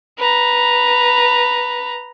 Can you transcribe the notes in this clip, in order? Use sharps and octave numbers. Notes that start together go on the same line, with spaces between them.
B4 A#5